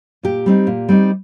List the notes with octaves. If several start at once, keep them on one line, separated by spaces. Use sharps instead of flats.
A#2 G4
G3 C4 D#4
A#2
G3 C4 D#4